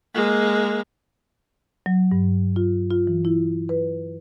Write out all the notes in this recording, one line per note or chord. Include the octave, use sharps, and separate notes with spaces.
G#3 A#3
F#3
G2
F4
F4
E3
E4
B4